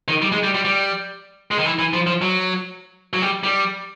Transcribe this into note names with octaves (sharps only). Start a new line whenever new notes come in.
D#3
G3
G#3
G3
G3
G3
G#3
D#3
E3
E3
F3
F3
F#3
F#3
G3
G3